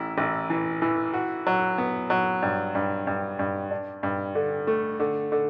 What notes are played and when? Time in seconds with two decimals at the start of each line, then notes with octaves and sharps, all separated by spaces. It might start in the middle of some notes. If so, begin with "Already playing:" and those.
Already playing: A1 E4
0.18 A1
0.50 E3
0.82 E3
1.14 F#4
1.47 F#3
1.78 B3
2.10 F#3
2.42 G2
2.75 G2
3.07 G2
3.39 G2
3.71 D4
4.03 G2
4.35 D3
4.67 A3
5.00 D3
5.32 D3